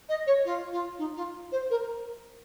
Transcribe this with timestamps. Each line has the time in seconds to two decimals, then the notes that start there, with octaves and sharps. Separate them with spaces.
0.09 D#5
0.27 C#5
0.45 F4
0.72 F4
0.98 D#4
1.16 F4
1.52 C5
1.70 A#4